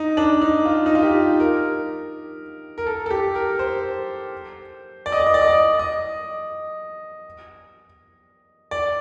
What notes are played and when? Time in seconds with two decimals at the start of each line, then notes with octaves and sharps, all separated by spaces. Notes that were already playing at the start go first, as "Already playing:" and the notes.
Already playing: D#4
0.17 D4
0.41 D#4
0.66 F4
0.86 D#4
0.95 F4
1.03 G4
1.40 A#4
2.78 A#4
2.86 A4
3.06 A4
3.10 G4
3.35 A#4
3.59 C5
5.06 D5
5.12 D#5
5.20 D5
5.26 D#5
5.34 D5
5.41 D#5
5.48 D5
5.79 D#5
8.71 D5